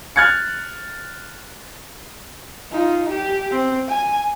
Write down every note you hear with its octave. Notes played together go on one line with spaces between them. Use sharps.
F6 F#6 G#6 A6 C#7
D#4 F4
G4
C4
G#5